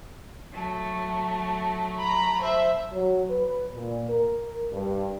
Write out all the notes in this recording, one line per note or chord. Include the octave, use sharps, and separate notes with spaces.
F#3 A3
A#5 B5
C5 E5
F#3
B4
A#2
A#4
G2